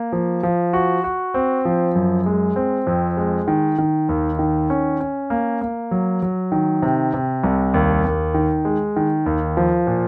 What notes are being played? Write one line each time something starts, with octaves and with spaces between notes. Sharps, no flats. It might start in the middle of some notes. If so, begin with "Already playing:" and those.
Already playing: A#3
F3
F3
F#4
F#4
C4
F3
F#2
G#3
C4
F2
G#3
D#3
D#3
D#2
D#3
C#4
C#4
A#3
A#3
F#3
F#3
D#3
C3
C3
C2
D#2
D#2
D#3
G#3
D#3
D#2
F3
A#2